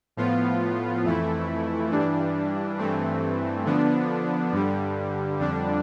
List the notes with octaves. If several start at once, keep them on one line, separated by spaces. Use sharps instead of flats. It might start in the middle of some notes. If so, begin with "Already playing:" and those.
A2 F3 B3 F4
F2 E3 A3 E4
G2 E3 G3 D4
G2 E3 A3 C4
D3 F3 B3 D4
G2 D3 G3
F2 D3 G3 D4